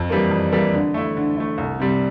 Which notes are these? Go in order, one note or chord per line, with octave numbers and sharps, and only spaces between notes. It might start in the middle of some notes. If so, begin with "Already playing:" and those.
Already playing: F2
E3 G3 A#3
F2
E3 G3 A#3
D3
A3 E4
D3
A3 E4
C2
C3 G3